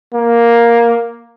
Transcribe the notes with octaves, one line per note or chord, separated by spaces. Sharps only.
A#3